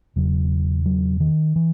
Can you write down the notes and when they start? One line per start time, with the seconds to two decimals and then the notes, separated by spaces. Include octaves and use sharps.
0.16 E1 E2 C#3 F#3
0.86 F#3
1.20 D#3
1.56 E3